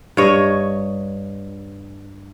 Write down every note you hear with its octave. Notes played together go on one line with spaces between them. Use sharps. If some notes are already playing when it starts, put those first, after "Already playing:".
G2 C#5 D#5